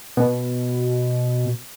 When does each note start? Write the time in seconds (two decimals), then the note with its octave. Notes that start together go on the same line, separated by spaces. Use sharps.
0.17 B2